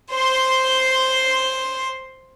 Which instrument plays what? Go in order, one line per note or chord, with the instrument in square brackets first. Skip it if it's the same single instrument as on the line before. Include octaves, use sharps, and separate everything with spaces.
[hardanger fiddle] C5 C6